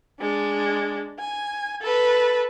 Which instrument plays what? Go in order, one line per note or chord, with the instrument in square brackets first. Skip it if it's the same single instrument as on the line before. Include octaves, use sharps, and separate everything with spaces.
[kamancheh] G#3 D4
G#5
A4 B4